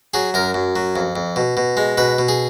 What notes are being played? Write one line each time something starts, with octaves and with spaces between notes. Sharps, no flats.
F#3 G#4
F#2 A#4
F#2
F#3
F2
F2
B2
B2
G#3
B2 B4
B2
G#4